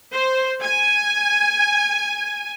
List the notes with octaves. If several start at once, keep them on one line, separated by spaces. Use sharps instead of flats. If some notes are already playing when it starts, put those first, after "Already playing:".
C5
G#5